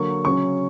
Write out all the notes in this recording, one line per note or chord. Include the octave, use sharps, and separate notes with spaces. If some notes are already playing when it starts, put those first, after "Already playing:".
Already playing: D3 F#3 A#3 C#6
C#3 F#3 C#4 C#6